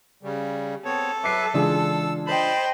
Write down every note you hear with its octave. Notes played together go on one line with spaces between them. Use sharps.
C#3 G3
B3 C4 A4 C#5
F#3 B4 E5 D6 C7
C#3 E3 G#3 D4 F4 G#4 E6
C5 D#5 G5 A5 B5